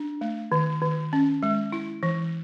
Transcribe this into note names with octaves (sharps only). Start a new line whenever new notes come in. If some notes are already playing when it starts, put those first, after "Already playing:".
Already playing: D4
A3
D#3
D#3
C#4
G#3
E4
E3